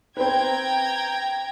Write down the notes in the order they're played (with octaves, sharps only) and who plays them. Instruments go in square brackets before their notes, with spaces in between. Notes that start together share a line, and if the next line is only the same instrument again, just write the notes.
[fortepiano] C4 B4 [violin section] G5 A#5 G#6